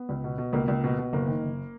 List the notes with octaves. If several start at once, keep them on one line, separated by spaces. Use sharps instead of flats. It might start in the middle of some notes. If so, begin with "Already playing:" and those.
Already playing: B3
C#2
B2
B2
C#2 A#3
C#2
B2
B2
F#1 A#3
D#3
F#1